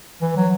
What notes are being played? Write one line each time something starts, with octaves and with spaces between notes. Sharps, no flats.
E3
F#3